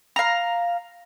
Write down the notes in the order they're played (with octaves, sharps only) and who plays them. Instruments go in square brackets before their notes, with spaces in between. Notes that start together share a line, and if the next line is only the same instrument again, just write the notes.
[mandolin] F5 A#5